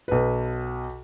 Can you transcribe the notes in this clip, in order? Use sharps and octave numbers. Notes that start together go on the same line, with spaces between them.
B1 B4